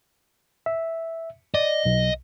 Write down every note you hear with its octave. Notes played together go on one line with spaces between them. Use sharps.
E5
D5 D#5
B1